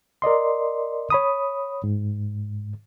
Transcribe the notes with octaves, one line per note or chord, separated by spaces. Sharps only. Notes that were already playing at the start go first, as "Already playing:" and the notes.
A#4 D5 D#5 C6
C#5 B5 D#6
G#2